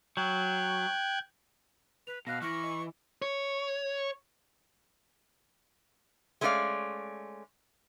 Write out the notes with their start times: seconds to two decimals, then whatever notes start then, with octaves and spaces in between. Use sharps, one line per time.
0.17 F#3 G5 F#6 G#6
2.07 B4 F7
2.27 B2 F5 F#6 A#6
2.42 E3 C#6 F6 A#6
2.64 D#5
3.22 C#5
6.41 G#3 A3 C#4 F#4 D5 F5